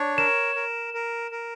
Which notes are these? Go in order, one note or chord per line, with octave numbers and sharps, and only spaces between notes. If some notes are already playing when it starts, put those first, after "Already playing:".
Already playing: D4 C#5
A#4 E7
A#4
A#4
A#4